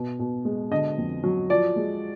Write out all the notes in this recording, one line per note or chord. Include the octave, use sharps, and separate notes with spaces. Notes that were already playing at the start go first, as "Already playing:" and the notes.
Already playing: B2
B2
G#3
D3 D#5
F2
F#3
F3 D5
G#3